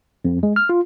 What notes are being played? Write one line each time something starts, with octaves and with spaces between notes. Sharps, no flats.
F2
G#3
F6
F4